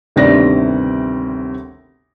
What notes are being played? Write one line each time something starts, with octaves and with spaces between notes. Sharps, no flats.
G1 D2 C3 D#3 D5 A#6